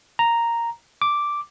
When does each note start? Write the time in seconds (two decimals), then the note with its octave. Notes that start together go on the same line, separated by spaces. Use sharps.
0.19 A#5
1.02 D6